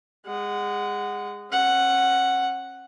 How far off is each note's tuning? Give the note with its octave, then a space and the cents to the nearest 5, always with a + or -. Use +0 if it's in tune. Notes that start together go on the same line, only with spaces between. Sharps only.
G#3 -20 F#5 +0
C#4 -40 F#5 +0